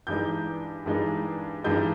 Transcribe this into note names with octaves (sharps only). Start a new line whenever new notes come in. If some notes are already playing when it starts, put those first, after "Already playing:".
G2 E3 G#3 D#4 G6
G2 E3 G#3 D#4
G2 E3 G#3 D#4 G6